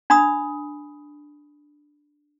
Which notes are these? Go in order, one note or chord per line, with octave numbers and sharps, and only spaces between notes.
D4 B5 D#6